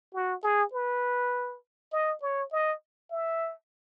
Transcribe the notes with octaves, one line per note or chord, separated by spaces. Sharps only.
F#4
G#4
B4
D#5
C#5
D#5
E5